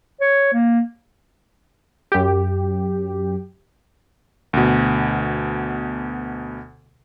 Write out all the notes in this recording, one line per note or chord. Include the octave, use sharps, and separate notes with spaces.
C#5
A#3
F#2 G4
D2 B2